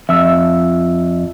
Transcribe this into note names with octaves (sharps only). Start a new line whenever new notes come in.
F2 E5 E6